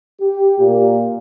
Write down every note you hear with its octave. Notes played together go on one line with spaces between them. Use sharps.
G4
A#2